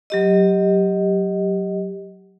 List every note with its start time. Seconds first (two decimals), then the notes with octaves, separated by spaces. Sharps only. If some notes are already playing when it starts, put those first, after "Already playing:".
0.10 F#3 G4 D#5